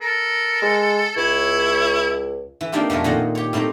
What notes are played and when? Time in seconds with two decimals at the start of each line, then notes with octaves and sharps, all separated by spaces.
0.01 A4 A#4
0.62 G#3
1.16 C#2 E4 C#5
2.61 E3
2.72 A#3 C4 D4 D#4 F4 G4
2.90 F2 B2 A3 A#4 G#5
3.04 A#2 D#3 C5 D#5 F#5
3.35 G4 C#5
3.53 A2 C4 D#4 G4 A#5